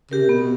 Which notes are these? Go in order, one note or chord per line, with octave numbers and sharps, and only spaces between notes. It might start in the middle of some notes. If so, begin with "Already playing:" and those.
C#3 G4 A#4
C3
B2 B3